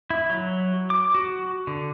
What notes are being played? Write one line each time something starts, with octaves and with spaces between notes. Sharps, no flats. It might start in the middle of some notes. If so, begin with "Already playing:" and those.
E4
F#3
D6
F#4
D3